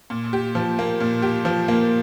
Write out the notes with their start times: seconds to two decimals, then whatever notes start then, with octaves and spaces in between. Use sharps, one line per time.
0.10 A#2
0.33 G4
0.55 F3
0.79 A#3
1.00 A#2
1.22 G4
1.45 F3
1.68 A#3